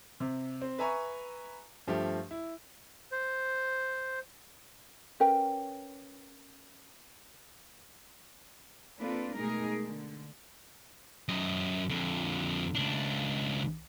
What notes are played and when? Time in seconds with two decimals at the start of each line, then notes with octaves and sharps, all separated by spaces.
0.20 C3
0.62 C4
0.78 B4 E5 G#5 A#5 B5 C#6
1.87 G2 F3 A3 G4
2.31 E4
3.12 C5
5.20 C#4 A#4 B4 G5
8.98 A#3 C4 D4 F4 A4 B4
9.36 B2 G#3 A3 D#4 G#4 A#4
9.82 D3
11.29 F#2 D#5
11.90 F2 D3
12.75 C#2 D4